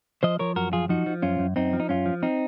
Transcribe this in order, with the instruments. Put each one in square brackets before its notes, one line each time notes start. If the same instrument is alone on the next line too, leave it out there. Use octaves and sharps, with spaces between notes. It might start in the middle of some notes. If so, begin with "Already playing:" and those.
[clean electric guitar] F3 C5 D#5
F3 A#4 C#5
F#2 F#4 A#4
F3 F4 G#4
F3 D#4 F#4
F3
F#2 C#4 F4
F#2
F#2 C4 D#4
F3
D#4
F#2 C#4 F4
F3
C4 D#4